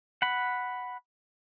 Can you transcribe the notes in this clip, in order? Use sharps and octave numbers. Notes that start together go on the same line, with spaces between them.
F#5 B5